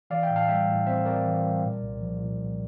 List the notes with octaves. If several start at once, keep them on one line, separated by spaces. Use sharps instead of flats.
E3 D5 F5
E5 G5
A2
F5 A5
G3 E5 G5
A2
C4 C5 E5
C4 A#4 D5
E3
G3
A#2
C2
F3
A#2
C2